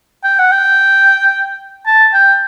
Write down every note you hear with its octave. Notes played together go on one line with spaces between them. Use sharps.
G5
F#5
G5
A5
G5